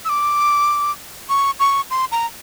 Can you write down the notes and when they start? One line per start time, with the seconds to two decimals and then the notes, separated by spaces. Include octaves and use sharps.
0.05 E6
0.09 D6
1.29 C#6
1.60 C#6
1.91 C6
2.12 A#5